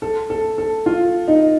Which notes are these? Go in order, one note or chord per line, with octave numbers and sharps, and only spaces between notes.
A4
A4
A4
F4
D#4